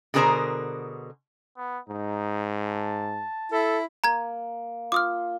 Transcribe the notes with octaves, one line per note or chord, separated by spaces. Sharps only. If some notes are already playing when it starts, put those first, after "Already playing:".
B2 D3 G#4 A#4 C5 A#5
B3
G#2 D#4
A5
E4 A4
A#3 A#5 G#6
F4 D6 D#6 F6